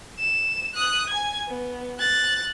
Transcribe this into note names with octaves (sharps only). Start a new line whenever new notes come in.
E7
D#6 F#6
G#5 G#6
B3
F#6 A6